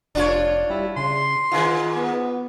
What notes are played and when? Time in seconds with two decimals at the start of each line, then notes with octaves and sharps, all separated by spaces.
0.15 F1 D4 F4 C#5
0.70 G3 E4
0.97 C#3 C6
1.52 G#2 D#3 F4
1.95 B3